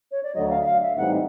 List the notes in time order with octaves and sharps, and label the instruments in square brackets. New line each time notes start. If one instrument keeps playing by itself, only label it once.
[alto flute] C#5
D5
[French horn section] D2 D3 F#3 [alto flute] D#5
[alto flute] F5
E5
F5
E5
[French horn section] A2 E3 G3 C4 D#4 [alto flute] F#5